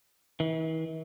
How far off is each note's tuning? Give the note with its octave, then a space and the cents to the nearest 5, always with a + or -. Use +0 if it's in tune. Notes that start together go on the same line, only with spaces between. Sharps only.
E3 -45